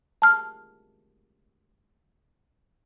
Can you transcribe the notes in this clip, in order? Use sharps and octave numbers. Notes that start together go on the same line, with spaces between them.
A5 F6